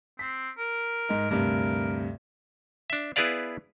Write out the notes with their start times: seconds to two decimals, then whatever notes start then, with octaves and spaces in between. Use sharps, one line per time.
0.19 C4 B6
0.58 A#4
1.09 G#2 D#4
1.30 D2 G2 C3 A#4
2.90 D4 E5
3.16 B3 E4 G#4 B4 D5 F5